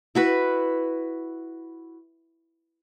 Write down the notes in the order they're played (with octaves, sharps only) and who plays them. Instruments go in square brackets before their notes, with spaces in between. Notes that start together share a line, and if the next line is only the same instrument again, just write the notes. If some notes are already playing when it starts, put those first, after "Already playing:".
[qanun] E4 F#4 B4